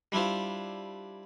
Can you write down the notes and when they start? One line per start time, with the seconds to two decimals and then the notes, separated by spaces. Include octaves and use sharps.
0.12 G3 D4 E4 F4 C5